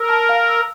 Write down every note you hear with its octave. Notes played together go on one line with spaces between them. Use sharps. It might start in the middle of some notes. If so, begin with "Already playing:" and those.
Already playing: A#4 E6
A5
F5
E6